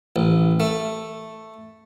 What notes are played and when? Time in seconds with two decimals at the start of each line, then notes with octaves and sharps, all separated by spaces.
0.16 A1
0.60 A3